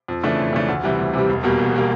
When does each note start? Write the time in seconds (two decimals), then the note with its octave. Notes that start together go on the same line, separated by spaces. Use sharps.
0.08 F2
0.23 C#3 E3 A3 D4
0.38 F2
0.53 C#3 E3 A3 D4
0.68 D2
0.83 C3 E3 G3
0.98 D2
1.13 C3 E3 G3
1.29 E1
1.43 E2 B2 G3 A#3
1.59 E1
1.74 B2 G3 A#3